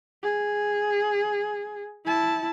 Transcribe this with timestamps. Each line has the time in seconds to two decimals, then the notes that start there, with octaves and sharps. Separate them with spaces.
0.23 G#4
2.05 E4 A5